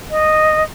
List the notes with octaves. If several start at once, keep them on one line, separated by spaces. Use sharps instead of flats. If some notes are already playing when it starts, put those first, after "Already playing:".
D#5